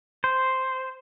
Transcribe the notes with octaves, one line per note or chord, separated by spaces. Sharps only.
C5